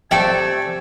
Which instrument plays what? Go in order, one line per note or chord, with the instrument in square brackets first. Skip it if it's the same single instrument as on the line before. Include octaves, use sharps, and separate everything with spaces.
[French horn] C3 [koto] A3 A4 D5 [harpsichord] E5 G5 [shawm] G#5